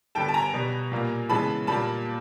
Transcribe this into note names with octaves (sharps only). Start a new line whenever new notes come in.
G2 D3 G3 B3 G5 A5
A5
G#5 A#5
B2 G3 B3
A#2 G3 A#3
C#3 E3 G#3 B3 A5 B5
A#2 G3 A#3 A5 B5